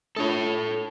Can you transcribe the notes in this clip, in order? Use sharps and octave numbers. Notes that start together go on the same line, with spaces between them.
A3 D4 F4 A4 C#5